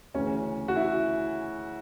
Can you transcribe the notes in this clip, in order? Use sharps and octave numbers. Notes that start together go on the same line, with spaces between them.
D2 C#3 E3 C#4
F#4
E4